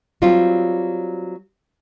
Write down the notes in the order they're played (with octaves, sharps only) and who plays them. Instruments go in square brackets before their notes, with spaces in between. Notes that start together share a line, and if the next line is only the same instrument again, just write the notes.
[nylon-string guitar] F#3 G3 C4 F4